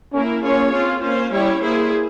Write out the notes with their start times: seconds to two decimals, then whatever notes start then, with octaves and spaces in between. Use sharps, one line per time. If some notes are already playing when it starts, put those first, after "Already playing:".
0.13 A#3 C#4 E4 A#4
0.43 A#3 C#4 F4 G#4 C#5
0.73 C4 F4 G#4
1.02 A#3 C#4 F4 C5
1.32 G3 C#4 E4 G4 C#5
1.61 A#3 E4 G#4 C5